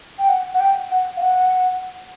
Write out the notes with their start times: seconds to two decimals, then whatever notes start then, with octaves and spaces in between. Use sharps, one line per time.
0.19 G5
0.29 F#5
0.54 F#5
0.60 G5
0.91 F#5
1.17 F5
1.22 F#5